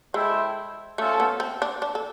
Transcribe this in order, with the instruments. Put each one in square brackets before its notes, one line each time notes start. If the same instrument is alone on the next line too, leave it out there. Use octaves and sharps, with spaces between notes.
[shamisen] G#3 [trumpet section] E4 A4 C5 E5 G5
[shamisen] A3 [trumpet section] C#4 F4 A4 C5
[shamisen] B3
C4
D4
D4
A4